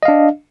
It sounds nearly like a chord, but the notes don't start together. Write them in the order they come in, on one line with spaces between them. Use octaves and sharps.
D#5 F5 D4